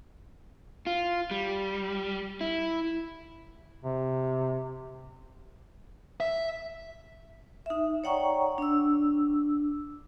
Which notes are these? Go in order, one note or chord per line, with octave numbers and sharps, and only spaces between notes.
F4
G3
E4
C3
E5
D#4 E5
C#5 D5 F#5 G5 A#5 C#6
D4 E6